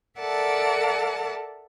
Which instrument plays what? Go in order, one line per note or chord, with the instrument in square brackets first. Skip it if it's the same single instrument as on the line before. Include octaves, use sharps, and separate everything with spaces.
[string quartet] A4 A#4 D5 E5 F#5 A5